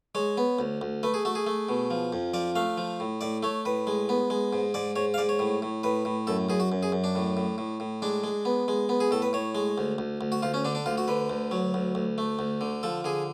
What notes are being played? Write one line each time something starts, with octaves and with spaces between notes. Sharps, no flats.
G#3 C#5
B3
D2
D2
A3 B4
G#4
A3 F#4
G#4
A3
B2
F3
F2
F3 D5
A3 F5
F3
A2
A2 D5
A3 C#5
A2 B4
G#3
B3
G#3
G#2
G#2 D5
G#2 C#5
F5
G#2 D5
C#5
A2
A2
A2 B4
A2
F#2 A4
F#2 G#4
F#4
F#2
G#4
F#2
D4
A2
A2
A2
A2
G#3 D4
G#3
B3
G#3
B3
G#4
A2 A4
B4
A2 C#5
G#3
D2
D2
D2
F#4
D2 F4
C#4
D3 D4
D4
D2 F4
F#4
D3 B4
D2
F#3
D2
D2
A3
D2
D3
F3 A4
D3 G#4